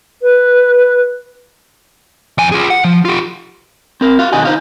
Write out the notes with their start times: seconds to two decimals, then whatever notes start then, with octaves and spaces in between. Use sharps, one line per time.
0.22 B4
2.38 F2 G#5
2.52 F4 G#4
2.70 F#5
2.84 F3
3.05 F4 G4
4.01 C4 A#4
4.19 F#4 F5
4.32 B2 D3 D#3 F#4 D#5 G#5
4.45 D#4 C5 F5